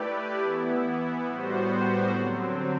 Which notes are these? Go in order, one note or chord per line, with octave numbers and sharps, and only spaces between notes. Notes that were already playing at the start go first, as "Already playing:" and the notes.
Already playing: A3 E4 G4 B4 D5
E3 B3 E4
A2 G3 B3 F#4 C5
D3 F#3 C4